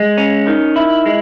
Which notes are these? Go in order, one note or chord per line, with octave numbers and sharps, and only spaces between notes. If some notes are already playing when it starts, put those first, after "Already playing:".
Already playing: G#3
C#4
D#3
E4
G#3